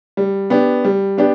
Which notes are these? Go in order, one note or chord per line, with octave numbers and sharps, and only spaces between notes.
G3
B3 D4 G4
G3
B3 D4 G4